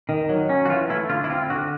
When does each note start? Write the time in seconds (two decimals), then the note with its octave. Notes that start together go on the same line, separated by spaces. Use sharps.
0.09 D#3
0.29 F#3
0.49 C#4
0.65 F#4
0.69 E3 F4
0.89 A3 E4
1.09 D3 F4
1.24 E4
1.30 C4 F4
1.50 D3 F#4